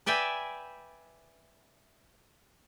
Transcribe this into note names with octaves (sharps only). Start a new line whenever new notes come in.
B4 D5 E5 G5 G#5